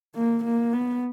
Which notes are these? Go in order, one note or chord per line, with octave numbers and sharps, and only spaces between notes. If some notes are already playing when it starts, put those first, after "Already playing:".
A#3
A#3
B3